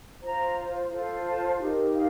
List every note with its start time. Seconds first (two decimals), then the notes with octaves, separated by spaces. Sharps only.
0.23 F4 C5 A#5
0.92 F4 A4 C5
1.26 A5
1.60 D#4 G4 A#4
1.94 F5